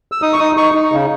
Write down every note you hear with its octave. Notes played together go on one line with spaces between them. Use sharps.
E6
D#4 D#6
C#6
D#4 D#6
D#4 C#6
D#4
C#3